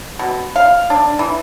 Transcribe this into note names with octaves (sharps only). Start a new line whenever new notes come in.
B2
F5
D4
E3